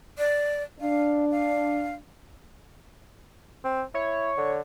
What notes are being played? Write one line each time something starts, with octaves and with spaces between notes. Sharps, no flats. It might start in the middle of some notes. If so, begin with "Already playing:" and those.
D5
D4 F5
F5
C4
E4 C#5
D3